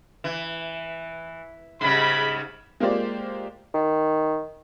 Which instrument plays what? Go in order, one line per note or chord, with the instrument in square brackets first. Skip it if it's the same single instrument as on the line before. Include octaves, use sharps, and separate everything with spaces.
[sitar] E3
[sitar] G#2 C#3 G3 [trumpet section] B5
[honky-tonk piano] G#3 A#3 F4 G4 C5 D5
[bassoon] D#3